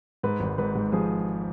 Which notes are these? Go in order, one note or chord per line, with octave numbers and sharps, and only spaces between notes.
G#2 B4
G#1
G#2 B4
G#2
F3 G#4